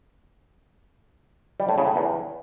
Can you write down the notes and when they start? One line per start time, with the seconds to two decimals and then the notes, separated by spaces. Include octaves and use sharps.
1.60 G3
1.69 A2
1.78 C#3
1.87 A2
1.96 E2